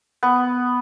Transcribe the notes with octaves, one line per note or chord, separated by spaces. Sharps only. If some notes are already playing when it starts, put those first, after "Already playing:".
B3